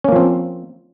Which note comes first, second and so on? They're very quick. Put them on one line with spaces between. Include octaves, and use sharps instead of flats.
C#4 A#3 F3 C4